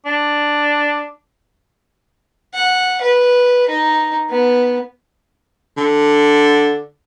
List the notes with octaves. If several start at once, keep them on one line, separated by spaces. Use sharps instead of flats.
D4
F#5
B4
D#4
B3
D3